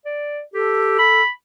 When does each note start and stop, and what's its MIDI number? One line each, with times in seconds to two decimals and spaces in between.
0.05 0.41 74
0.54 0.96 67
0.54 1.22 69
0.98 1.29 83